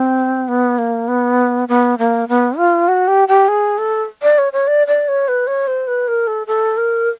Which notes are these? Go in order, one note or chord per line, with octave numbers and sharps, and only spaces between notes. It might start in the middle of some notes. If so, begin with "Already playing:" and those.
Already playing: C4
B3
A#3
B3
B3
A#3
B3
F4
F#4
G4
G4
G#4
A4
D5
C#5
C#5
D5
D5
C#5
B4
C#5
C5
B4
A#4
A4
A4
A#4